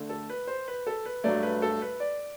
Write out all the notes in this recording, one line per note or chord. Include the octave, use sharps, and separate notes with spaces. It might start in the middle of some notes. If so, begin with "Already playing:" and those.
Already playing: D3 A3
A4
B4
C5
B4
A4
B4
G2 F#3 A3 D5
B4
A4
B4
D5